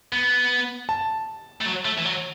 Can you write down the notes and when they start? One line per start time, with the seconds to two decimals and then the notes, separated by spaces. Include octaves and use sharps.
0.13 B3
0.89 A5
1.61 A3
1.66 F#3
1.85 A3
1.98 E3
2.05 F#3